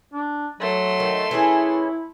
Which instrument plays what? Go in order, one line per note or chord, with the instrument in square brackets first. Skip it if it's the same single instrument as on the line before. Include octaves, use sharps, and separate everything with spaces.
[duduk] D4
[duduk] F#3 [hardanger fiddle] A3 C6
[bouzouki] D#3
[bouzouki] E3 C#4 G#4 [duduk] E4